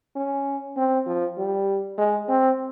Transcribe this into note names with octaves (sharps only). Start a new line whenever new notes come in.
C#4
C4
F3
G3
G#3
C4